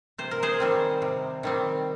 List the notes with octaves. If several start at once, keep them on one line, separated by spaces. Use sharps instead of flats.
C3 C5
A#4
G#4 C5
D#3 G3 C4
C3
D#3 G3 C4